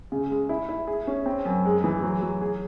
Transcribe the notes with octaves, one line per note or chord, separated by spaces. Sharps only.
C#3
G#3
E4
E4
G#4
C#4
C4
F#2
G#3
E3
F#3
F#3
G#4